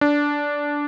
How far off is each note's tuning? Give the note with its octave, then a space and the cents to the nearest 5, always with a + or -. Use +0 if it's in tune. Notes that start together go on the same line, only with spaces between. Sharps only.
D4 -10